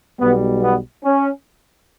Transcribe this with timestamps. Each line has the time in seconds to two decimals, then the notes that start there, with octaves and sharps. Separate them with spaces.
0.20 B1 B2 G3 B3
0.62 B3
1.04 C#4